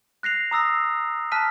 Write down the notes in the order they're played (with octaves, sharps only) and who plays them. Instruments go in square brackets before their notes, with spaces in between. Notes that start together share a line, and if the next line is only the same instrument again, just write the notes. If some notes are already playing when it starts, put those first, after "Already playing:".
[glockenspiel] F#6 A#6 C7 F7
A#5 D#6 E6 A#6 C7
A5 F6 F#6 B6 D#7